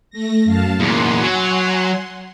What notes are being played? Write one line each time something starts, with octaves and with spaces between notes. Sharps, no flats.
A3 A#6
F#2 F5 A5
E2 A#2 F#5 G#5 C6
F#3